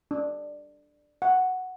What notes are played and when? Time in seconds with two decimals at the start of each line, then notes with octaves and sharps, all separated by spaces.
0.11 D4
1.22 F#5